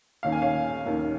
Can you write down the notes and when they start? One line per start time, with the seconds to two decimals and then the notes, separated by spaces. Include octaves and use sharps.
0.23 D#2 D#3 A#3 C#4 F5
0.32 G#5
0.42 C#5 F5
0.85 D#2 D#3 A#3 C#4